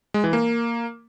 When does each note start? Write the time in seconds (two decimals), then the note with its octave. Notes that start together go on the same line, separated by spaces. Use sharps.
0.14 G#3
0.24 E3
0.33 A#3